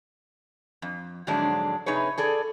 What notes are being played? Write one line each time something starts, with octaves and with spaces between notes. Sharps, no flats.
F2
F2 G#2 D3 F#3 G#3 D4
C3 D#4 G#4 B4 C#5
G#4 A4 D5